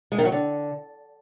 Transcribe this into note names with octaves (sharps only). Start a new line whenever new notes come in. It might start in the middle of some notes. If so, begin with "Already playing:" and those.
G#3
D#3
F#3
D3